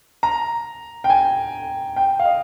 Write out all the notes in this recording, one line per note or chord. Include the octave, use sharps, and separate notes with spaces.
A#5
G5
G#5
G5
F5
D#5